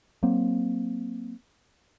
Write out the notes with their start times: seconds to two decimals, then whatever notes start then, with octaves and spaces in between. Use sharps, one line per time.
0.23 F#3 A#3 C4